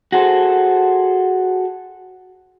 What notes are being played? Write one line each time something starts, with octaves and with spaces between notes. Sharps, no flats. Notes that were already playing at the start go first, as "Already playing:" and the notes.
F#4 G#4 A4 C5